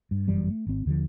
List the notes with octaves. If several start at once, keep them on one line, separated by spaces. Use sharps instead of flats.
G2
G1 F#2 E3 G3
A3
G#1 C4
D#2 D3 D#3 F3